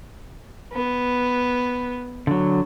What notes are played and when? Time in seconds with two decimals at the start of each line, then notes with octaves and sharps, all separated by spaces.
0.73 B3
2.27 D3 F#3